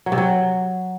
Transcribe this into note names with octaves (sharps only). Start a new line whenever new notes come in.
F#3
C3
F#3